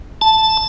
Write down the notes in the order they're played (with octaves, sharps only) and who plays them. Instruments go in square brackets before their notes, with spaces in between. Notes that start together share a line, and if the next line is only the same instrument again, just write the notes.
[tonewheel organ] A5